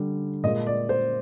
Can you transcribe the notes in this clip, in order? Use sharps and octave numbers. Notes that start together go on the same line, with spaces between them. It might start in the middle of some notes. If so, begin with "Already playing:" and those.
Already playing: D3 G3
A#2 G#3 D#5
D5
C5